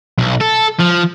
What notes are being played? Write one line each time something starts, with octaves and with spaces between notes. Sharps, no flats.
B1
A4
F3